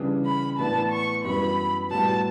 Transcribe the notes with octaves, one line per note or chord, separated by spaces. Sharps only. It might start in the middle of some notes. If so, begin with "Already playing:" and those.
Already playing: C#3 E3 G3 D4
B5
A2 E3 B3 D4 A5
C#6
F#2 E3 G3 B3 B5
A2 G3 B3 F#4 A5